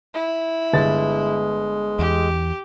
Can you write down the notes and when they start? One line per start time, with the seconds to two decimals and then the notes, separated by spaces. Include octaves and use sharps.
0.14 E4
0.73 G1 G#3 B4 A6
1.99 E2 G4